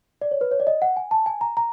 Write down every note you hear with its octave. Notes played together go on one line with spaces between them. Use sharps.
D5
C#5
B4
C#5
D5
D#5
F#5
G#5
A5
G#5
A#5
A#5